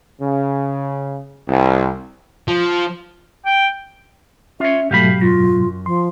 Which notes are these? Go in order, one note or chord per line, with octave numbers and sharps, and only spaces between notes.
C#3
C2
F3
G5
C#4 F4 C#5 E5
G#2 B2 F#3 A3 G4 F5 B5
F#2 F4
F3 C6